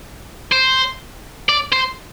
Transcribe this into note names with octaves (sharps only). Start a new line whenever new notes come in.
C5
D5
C5